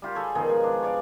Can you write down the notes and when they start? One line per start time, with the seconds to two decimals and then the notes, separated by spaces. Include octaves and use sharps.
0.02 G3 F4 G4
0.15 G#4 A4 C#5
0.35 B2 D#3 F3 G#4
0.49 G#3
0.64 D4
0.82 C#5 D5 F5